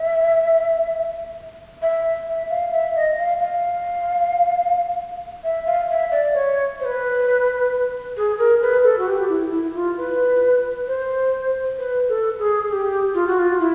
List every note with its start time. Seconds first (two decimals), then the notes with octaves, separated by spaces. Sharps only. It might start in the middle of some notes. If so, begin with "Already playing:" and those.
Already playing: E5
1.82 E5
2.27 E5
2.50 F5
2.72 E5
2.96 D#5
3.18 F5
3.41 F5
5.44 E5
5.66 F5
5.90 E5
6.12 D5
6.34 C#5
6.80 C5
6.85 B4
8.17 G#4
8.39 A#4
8.62 B4
8.84 A4
8.98 F#4
9.07 G4
9.29 E4
9.52 E4
9.74 F4
9.98 B4
10.88 C5
11.79 B4
12.09 A4
12.39 G#4
12.69 G#4
12.72 G4
13.14 F4
13.27 F#4
13.39 F4
13.59 E4